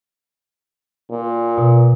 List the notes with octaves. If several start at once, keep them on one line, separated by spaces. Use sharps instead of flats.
A#2
B2